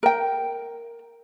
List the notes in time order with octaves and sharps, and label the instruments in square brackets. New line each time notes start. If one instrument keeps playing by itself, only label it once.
[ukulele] A#4 G5